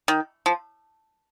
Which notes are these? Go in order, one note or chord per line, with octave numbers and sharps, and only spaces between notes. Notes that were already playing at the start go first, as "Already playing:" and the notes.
D#3
F3